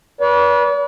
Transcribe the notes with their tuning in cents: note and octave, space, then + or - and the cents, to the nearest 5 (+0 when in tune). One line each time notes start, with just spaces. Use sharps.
B4 -30 D5 -45